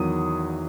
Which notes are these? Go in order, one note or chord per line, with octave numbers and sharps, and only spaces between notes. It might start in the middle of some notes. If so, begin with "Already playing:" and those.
Already playing: E2 D#3 F#3 D#6